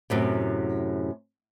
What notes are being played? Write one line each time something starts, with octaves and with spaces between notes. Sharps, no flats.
F#2 A2 C3